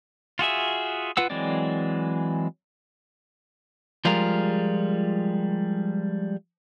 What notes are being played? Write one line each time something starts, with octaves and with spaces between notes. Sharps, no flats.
F4 F#4 G#4 E5
F4 B4 F#5 E6
E3 F#3 G#3 C4 D5
F3 G3 G#3 F4 G#4 A#4